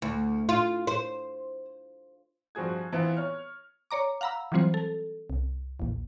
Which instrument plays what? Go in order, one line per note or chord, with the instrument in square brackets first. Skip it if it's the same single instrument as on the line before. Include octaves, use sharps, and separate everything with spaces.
[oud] D2
F4
C5
[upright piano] G2 F3 C4 F#4 G#4 G#6
E3 B3 C4 E4 F4
C#5 F6
[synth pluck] C#5 D5 A#5 D6
F5 F#5 A#5 B5 E6
E3 F#3 G3 C4 F4 C5
A4
C2
A#1 E2